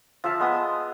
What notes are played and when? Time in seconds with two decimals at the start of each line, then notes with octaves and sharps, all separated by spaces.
0.24 F3 E5 F5 A5
0.40 G#3 B3 D#6